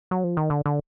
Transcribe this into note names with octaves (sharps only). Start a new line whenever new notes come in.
F#3
F3
D#3
D3
D3